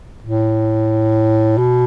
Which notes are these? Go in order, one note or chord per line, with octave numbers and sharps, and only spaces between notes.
A2
B2